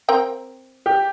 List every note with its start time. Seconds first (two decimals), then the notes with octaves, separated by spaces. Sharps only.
0.09 C4 A#4 G5
0.86 G4